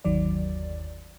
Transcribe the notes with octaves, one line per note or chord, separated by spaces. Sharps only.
G1 D#2 D#3 F#3 D5